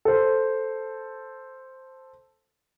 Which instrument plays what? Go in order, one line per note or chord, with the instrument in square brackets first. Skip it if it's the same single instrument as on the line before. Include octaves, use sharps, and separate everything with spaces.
[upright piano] A4 C5